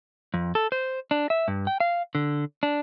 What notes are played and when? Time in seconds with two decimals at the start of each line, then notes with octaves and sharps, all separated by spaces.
0.34 F2
0.55 A4
0.72 C5
1.11 D4
1.30 E5
1.48 G2
1.67 G5
1.80 F5
2.15 D3
2.63 D4